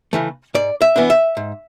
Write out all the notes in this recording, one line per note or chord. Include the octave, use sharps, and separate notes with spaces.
C#3 E3 A3
G#2 D5
E5
E3 B3 D4
E5
G#2